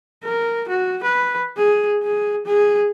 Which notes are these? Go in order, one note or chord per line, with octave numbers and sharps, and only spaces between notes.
A#4
F#4
B4
G#4
G#4
G#4